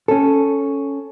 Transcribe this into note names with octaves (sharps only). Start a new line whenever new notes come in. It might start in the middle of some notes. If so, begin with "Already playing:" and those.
C#4 A4